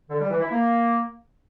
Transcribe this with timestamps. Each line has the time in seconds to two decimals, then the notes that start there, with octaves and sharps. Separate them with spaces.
0.09 D3
0.20 G3
0.30 E3
0.41 E4
0.51 A#3